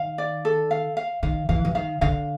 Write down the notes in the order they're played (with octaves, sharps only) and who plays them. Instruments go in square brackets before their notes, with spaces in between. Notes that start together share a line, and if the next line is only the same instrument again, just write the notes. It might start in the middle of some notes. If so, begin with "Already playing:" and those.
Already playing: [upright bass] D#3 [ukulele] F5
[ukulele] D5
A4
F5
F5
[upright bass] D#3 [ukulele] F5
[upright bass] E3 [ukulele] F5
[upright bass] E3
[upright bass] D#3 [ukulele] F5
[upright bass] D3 [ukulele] F5